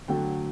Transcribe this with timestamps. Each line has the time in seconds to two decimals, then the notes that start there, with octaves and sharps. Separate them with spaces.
0.08 D3 F#3 A3 G5